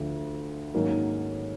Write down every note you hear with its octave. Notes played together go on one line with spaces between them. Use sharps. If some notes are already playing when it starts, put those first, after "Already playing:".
Already playing: D2 D3 F3
G#2 D#3 F#3 A#3 C#4